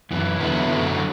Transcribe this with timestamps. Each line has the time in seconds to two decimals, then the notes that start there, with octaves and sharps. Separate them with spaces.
0.11 F#2 E3
0.40 E2 D3 F#3 B3 E4
0.71 F#2 D3 F#3